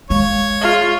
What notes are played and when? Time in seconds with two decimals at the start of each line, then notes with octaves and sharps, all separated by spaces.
0.10 G#3 C#5 F5
0.62 F4 G#4